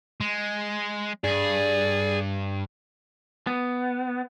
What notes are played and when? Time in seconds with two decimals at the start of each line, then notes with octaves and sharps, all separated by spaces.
0.21 G#3
1.24 G2 G#4 D5
3.47 B3